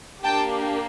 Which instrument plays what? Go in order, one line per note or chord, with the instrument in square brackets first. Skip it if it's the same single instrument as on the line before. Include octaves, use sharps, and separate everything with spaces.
[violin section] A#3 D4 G4 G5 A5